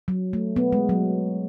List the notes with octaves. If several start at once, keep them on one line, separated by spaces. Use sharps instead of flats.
F#3
A3
B3
G#3
F#3